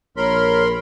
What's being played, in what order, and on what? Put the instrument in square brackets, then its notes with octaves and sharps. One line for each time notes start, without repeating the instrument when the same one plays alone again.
[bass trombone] A#1 [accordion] A#4 B5 C6 [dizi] C#5